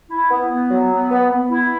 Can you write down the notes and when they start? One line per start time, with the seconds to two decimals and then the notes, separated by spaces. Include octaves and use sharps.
0.10 E4
0.31 B3
0.51 B3
0.71 F#3
0.91 B3
1.11 B3
1.31 B3
1.51 E4